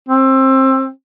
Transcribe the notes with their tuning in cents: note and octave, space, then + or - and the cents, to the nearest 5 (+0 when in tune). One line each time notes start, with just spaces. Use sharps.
C4 +25